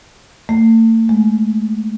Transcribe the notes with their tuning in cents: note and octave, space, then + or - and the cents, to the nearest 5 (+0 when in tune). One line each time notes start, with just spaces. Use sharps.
A3 +40
G#3 +35